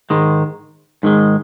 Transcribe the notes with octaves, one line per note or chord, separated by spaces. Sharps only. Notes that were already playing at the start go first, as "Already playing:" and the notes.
G#2 D#3 G#3
G#2 D#3 G#3